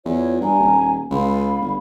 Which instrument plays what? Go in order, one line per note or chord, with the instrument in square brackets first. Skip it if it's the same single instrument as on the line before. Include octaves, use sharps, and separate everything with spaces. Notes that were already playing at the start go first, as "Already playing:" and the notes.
[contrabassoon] E2 [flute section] F4 C#5
[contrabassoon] G2 [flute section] G#5 A#5
[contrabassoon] D#1
[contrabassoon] C#2 [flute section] F5 B5
[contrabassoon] G1